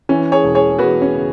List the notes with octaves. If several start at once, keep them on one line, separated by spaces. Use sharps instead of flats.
E3 C#4
G#4 C#5
E1
G#4 C#5
E2 F#4 B4
C#4
C#3